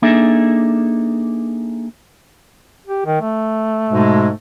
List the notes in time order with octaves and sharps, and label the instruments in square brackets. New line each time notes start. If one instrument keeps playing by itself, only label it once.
[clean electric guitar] A#3 D4 D#4 G#4 A4 E5
[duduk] G4
D#3
A3
[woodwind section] G#2 B2 G#3